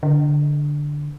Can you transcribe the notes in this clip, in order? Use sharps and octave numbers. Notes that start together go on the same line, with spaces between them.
D3